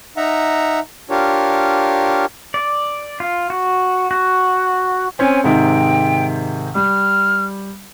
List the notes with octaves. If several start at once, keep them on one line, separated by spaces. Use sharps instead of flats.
D#4 E5 F#5 A#5
D4 F4 G4 A#4 C#5
D5
F4
F#4
F#4
C4 C#4 G#5
G#2 C3 D#3 G5
G3 F6